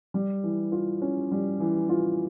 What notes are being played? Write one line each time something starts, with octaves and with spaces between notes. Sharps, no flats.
G3
E3
F4
C#4
G3
E3
F4